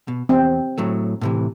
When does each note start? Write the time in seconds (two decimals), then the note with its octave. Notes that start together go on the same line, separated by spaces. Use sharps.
0.08 B2
0.29 E2 C4
0.78 A2 F#3 A3
1.21 A2 C3 E3